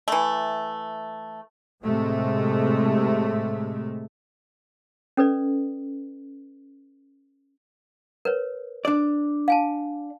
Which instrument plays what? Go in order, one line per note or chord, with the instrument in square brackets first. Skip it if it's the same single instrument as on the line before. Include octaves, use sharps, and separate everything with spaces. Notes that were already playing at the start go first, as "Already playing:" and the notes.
[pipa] E3 A3
[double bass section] A2 C3 G#3 A3
[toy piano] C#4 A4 B4 D5
A#4 B4 C#5
[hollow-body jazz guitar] D4 D5
[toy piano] F5 G#5 A5